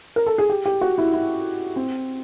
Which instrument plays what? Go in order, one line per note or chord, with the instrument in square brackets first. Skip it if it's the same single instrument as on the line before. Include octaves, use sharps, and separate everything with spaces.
[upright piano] A#4
A4
G#4
G4
G4
F#4
E4
E4
C4